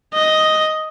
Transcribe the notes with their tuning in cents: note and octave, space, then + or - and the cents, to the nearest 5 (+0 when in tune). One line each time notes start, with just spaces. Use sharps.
D#5 +5